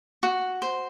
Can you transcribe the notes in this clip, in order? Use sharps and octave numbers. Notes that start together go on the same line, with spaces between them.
F#4
C5